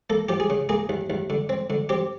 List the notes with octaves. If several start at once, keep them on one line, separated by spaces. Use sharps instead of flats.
A#3 A4
F3 G4
G#4
C#3
A#3 G#4
D#2
D#2
D3
C4
D3
C4 G4